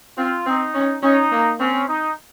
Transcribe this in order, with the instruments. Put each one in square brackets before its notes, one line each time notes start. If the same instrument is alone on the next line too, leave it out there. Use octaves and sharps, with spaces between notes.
[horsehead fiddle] C4 [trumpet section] F4
[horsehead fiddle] C4 [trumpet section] D#4
[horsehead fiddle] C#4
[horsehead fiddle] C#4 [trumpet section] D#4
[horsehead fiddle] A#3
[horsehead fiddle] C4 [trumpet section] C#4
[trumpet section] D#4